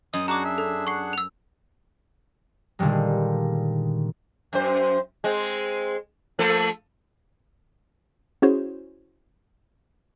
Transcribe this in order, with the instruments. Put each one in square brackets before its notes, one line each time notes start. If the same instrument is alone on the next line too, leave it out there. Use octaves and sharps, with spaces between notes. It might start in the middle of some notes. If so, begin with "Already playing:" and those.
[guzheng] F#2 [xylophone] D#5 [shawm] D#6
[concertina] D4 G#4 [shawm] F#4 [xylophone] A#5 D6
[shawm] E5
[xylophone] A4
[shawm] F#5 [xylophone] C#6 C7
[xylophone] E6 F7
[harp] A#2 D3 D#3 G3 G#3
[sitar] F#2 C5
G#3 C4
F3 A3 A4
[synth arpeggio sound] C#4 E4 F#4 G#4 C5 C#5